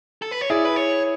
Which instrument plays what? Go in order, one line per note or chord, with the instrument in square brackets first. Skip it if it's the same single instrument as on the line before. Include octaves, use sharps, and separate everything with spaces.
[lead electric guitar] A4
B4
C#5
[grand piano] E4 G#4 [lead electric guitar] D5
[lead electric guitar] B4
C#5